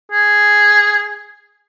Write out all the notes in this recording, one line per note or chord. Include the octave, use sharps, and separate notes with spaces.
G#4